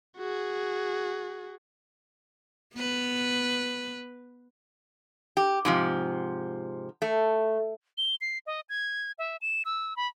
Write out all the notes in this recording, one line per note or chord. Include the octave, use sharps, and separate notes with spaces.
F#4 G#4
B3 B4
G4
G#2 C3 F3
A3
G7
C7
D#5
G#6
E5
E7
E6
B5